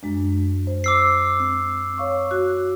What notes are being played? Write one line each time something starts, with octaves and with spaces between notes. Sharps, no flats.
F#2 G#3 D4
C5
D6 E6 C7
C4
C#5 F5 C#6
F#4 F#6